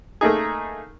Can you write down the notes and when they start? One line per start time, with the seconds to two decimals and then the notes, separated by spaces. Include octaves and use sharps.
0.21 A3 A#3 D#4 G#4